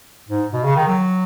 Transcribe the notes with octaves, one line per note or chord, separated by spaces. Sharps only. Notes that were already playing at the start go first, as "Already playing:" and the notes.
G#2
B2
C#3
D#3
F#3